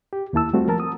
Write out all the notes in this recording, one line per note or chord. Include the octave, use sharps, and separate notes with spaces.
G4
D#2 A#3 E4 A5 E6
G3 A3 C4 F4 F#4
F3 A#4 A5
D#6